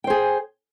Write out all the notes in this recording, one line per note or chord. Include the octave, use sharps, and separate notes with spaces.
G#4 C5 G5